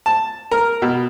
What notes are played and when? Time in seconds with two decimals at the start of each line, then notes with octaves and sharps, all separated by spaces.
0.06 A5
0.51 A#4
0.82 B2